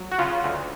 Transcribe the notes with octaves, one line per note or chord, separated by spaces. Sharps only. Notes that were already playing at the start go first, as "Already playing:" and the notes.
Already playing: F#3
F#4
C#3 F4
D2